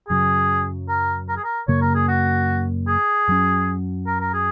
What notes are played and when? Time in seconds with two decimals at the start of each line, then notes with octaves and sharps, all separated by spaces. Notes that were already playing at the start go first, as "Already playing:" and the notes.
0.09 F#2 C#3 F#3 G#4
0.88 A#4
1.29 A#4
1.37 G#4
1.44 A#4
1.68 F#2 C#3 A#3 C#5
1.81 A#4
1.95 G#4
2.08 F#4
2.88 G#4
3.28 F#2 F#3 C#4
4.07 A#4
4.20 A#4
4.33 G#4